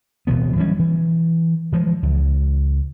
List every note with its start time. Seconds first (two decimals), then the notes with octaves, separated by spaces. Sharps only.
0.27 D1 B2 E3 B3
0.56 E3 F#3 G3 C#4
0.79 E3
1.72 E3 F3 G#3
2.03 C#2